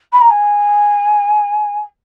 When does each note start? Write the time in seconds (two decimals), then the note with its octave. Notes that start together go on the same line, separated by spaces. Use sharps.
0.12 B5
0.21 A#5
0.30 G#5